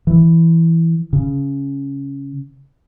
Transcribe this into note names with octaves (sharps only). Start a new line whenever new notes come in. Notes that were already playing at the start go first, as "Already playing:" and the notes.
E3
C#3